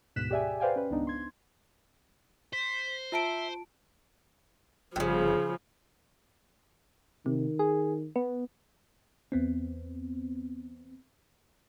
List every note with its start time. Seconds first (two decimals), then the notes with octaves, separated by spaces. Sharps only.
0.16 D2 G#2 B2 F#6 B6 E7
0.30 G4 G#4 D5 E5 G5 G#5
0.60 B4 C5 D5 F5 G5 G#5
0.76 C#4 B4
0.89 G#1 C#2 B3 D4 D#4
1.07 C6 G#6
2.53 C5 B6
3.12 F4 E5 A5 D7
4.96 G1 A2 C#3 F3
7.26 C3 D#3
7.59 G#4
8.16 B3
9.32 E2 B3 C4